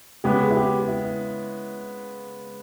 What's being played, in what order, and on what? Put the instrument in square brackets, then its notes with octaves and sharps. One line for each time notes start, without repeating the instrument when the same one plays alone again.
[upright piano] C#3 G#3 B3 [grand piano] G4
[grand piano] G#4
E4
G4
G4
E4
E4